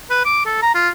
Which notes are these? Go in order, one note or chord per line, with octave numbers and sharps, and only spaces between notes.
B4
D6
A4
A#5
F4